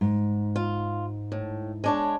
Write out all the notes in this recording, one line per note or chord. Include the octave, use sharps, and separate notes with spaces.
G#2
F4
A2
G#3 D4 C#5